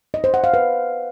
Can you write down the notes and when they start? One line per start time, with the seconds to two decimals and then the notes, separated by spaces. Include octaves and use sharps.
0.14 D#5
0.24 C5
0.34 F#5
0.44 F5
0.54 B4